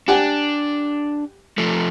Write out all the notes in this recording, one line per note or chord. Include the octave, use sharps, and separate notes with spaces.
D4 G4 F#5 G#5
F3 A3